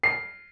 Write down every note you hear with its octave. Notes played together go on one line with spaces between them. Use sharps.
C7